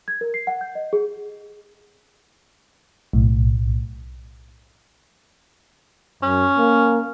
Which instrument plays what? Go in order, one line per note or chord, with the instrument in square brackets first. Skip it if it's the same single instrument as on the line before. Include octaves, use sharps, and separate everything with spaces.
[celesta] G#6
A#4
C7
F#5
G6
D#5
G#4
[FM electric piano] B1 A2
[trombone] F#2 [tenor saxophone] C#4
[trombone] A#3